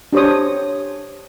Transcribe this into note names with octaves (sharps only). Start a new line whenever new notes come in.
D4 G4 C5 C#5 D#6